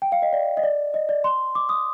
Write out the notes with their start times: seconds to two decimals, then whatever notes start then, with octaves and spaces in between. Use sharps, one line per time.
0.02 G5
0.12 F5
0.22 D#5
0.33 D5
0.57 D#5
0.63 D5
0.94 D#5
1.09 D5
1.24 C6
1.55 D6
1.69 D#6